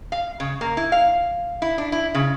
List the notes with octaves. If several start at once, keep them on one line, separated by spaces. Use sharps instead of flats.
F5
C#3
A#3
E4
F5
E4
D4
E4
C#3